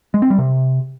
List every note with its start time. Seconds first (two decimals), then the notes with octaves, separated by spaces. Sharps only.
0.14 G#3
0.22 C4
0.30 G3
0.38 C3